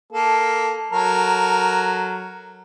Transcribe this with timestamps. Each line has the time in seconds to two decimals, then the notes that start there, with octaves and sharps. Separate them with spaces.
0.13 A#3 A4
0.92 F#3 A4 A#4